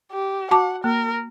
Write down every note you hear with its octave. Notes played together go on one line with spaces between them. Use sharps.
G4
F#4 F#5 A5 D6
A#3 A#4